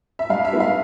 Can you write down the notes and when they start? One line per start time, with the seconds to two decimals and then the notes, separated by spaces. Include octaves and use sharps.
0.19 E5
0.30 G2 F5
0.45 E5
0.53 D#3 G#3 B3
0.60 F5